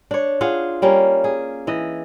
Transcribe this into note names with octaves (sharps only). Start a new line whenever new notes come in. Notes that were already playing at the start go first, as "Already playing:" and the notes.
D4 C#5
F4 G#4 F#5
G3 A#3 C#4
G#4
E3 D#5